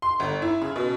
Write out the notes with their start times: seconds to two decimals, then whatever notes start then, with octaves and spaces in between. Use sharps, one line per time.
0.02 C6
0.20 G1
0.42 E4
0.61 C#3
0.76 B2